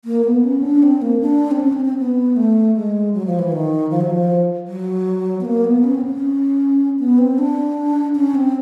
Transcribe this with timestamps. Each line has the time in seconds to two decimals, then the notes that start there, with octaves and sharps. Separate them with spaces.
0.05 A#3
0.25 B3
0.44 C#4
0.62 D4
0.83 C4
1.02 A#3
1.21 D4
1.51 C4
1.60 C#4
1.73 C4
1.85 C4
1.98 B3
2.36 A3
2.75 G#3
3.14 F#3
3.27 F3
3.39 E3
3.52 D#3
3.91 F3
4.01 F#3
4.10 F3
4.68 F#3
5.41 B3
5.45 A#3
5.64 B3
5.84 C#4
5.94 C4
6.05 C#4
6.99 B3
7.18 C4
7.38 D4
8.16 C#4
8.35 C4